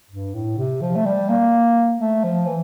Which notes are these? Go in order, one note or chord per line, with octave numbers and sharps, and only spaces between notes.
G2
A2
C3
F3
A3
G3
A#3
A3
F3
E3